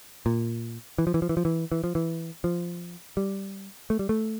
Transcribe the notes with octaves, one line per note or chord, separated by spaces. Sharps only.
A#2
E3
F3
E3
F3
E3
F3
E3
E3
F3
E3
F3
G3
A3
G3
A3